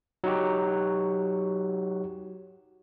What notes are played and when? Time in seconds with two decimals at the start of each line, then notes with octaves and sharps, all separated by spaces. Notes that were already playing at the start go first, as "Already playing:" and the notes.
0.24 F#3 D#4 F#4 G4